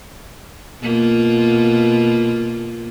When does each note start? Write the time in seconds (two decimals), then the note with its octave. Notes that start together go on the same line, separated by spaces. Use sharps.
0.81 B2 A#3 F4